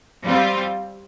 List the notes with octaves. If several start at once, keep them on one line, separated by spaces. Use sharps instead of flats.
G3 C4 F4